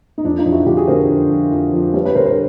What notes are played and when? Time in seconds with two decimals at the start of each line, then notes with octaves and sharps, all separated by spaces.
0.18 D#4
0.24 F2 D4
0.38 D#4 F4
0.46 F2
0.52 E4 F#4
0.66 D3 F4 G4
0.77 F#4 G#4
0.87 D3 A#4 C5
1.09 F2
1.31 F2
1.52 F2
1.74 F3
1.94 G3 B4 C#5
2.05 B4 C#5
2.15 D3 A#4 C5
2.25 A#4 C5